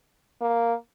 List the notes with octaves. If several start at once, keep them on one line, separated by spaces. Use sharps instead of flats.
A#3